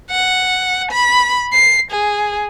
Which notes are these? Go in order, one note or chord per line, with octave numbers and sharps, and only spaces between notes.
F#5
B5
C7
G#4